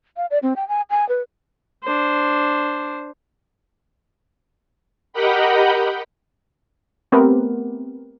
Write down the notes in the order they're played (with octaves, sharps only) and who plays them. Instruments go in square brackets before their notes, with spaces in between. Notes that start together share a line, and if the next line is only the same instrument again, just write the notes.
[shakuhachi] F5
D5
C4
G5
G#5
G#5
B4
[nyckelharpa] D4 C5
[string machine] G4 A#4 D#5 F#5 G5 B5
[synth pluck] A3 B3 C4 G4 A#4 B4